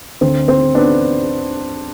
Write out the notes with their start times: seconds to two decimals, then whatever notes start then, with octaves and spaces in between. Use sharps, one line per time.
0.21 D2 D3 C4
0.48 C4
0.75 B3 D4